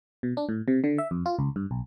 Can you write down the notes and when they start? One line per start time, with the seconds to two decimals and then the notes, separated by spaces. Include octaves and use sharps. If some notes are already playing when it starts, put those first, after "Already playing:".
0.23 B2
0.37 D4
0.49 A2
0.68 C3
0.84 D3
0.98 E5
1.11 F2
1.26 F4
1.39 C#2
1.56 G2
1.71 B1